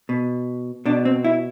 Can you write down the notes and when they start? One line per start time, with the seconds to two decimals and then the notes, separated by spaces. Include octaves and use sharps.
0.09 B2
0.85 B2 D4
1.05 C4
1.24 E4